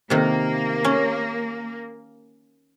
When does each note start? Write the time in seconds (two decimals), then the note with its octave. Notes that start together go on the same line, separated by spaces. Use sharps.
0.10 C3 D#3 A#3
0.84 C#4